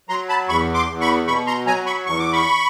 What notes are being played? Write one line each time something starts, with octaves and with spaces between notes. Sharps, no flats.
F#3 A#5 C6
A5 B5
E2 B5 C#6
C6 D6
E2
B5 C#6
B2 B5 C#6
A#5 C6
F#3 G#5 A#5
B5 C#6
E2 C#6
D6
B5 C#6